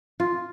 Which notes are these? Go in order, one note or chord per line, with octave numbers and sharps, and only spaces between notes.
F4